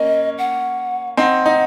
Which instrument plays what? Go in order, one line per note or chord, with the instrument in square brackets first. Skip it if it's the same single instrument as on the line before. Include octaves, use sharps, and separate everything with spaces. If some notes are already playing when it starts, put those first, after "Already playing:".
Already playing: [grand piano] A#3 C#4 [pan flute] D#5
[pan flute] F#5
[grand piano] C4 D#4 [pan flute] F#5
[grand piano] D#4